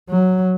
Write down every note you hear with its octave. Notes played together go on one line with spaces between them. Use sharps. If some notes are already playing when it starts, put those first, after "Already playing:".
F#3